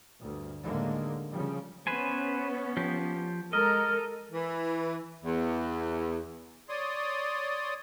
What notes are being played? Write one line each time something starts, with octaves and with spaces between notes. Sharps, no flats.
D2 G2
D#2 A2 D3 G#3 A#3
C#3 F3 G3
B3 C#4 B4 C5 G#5
F3 G4
G#3 A4 A#4 D#5 F6
E3
E2
C#5 D5 C6 D#6